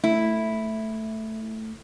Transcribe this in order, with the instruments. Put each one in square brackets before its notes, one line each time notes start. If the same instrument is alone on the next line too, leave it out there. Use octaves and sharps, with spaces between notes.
[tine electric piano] A3 [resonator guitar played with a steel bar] E4